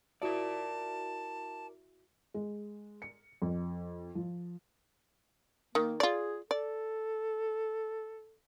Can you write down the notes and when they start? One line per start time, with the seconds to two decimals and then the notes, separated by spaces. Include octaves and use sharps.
0.22 E4 F#4 A#4 D5 E5 A5
2.34 G#3
3.02 C#7
3.42 F2
4.15 F3
5.75 D#3 A#3
6.00 F4 G#4 D5
6.51 A4 D5